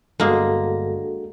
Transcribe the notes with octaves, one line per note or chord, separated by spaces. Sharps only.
G1 G2 G#3 A#3 D4 F#4 A4 A#6